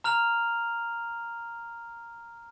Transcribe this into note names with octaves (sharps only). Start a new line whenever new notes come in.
A#5 F6 F7